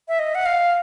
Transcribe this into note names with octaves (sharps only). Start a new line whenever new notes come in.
E5
D#5
F#5
F5